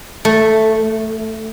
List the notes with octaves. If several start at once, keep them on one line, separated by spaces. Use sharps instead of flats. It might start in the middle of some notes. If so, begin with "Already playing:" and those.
A3